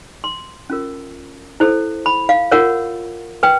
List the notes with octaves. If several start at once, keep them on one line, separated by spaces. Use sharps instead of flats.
C6
C#4 F4 A#4
E4 A4 C5
B5
F5
F4 A#4 C#5 F#5
B4 G5